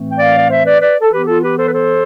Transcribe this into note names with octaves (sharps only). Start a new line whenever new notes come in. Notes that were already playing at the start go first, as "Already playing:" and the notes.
Already playing: A2 E3 A3 C4
G5
D5 F5
D5
C5 E5
B4 D5
B4 D5
A4
E3 B3 G4 B4
F4 A4
G4 B4
A4 C5
B4
A4 C5